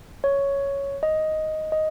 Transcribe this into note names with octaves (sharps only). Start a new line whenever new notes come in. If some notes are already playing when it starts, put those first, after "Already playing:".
C#5
D#5
D#5